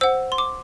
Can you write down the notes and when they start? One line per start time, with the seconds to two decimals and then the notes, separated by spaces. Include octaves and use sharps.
0.01 C5 F#5 E6
0.32 C6
0.38 D6